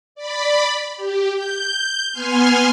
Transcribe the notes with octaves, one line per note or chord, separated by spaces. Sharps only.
D5 B5
G4
G6
B3 G#5 C6 F6